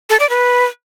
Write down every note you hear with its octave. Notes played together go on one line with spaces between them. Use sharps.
A4
D5
B4